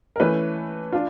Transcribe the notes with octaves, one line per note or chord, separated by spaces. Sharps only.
A#4
E3 A3 C#4 B4
D4 F4